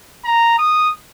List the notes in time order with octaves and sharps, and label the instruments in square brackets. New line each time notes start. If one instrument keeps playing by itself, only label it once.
[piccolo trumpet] A#5
D#6